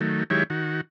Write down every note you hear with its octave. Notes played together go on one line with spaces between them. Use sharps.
D#3 F#3 A3
D#3 F#3 G#3 E4 G4 C#5
D#3 F#4